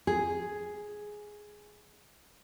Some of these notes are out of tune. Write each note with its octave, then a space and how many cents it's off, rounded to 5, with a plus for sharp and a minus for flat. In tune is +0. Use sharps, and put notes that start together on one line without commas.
G#4 +5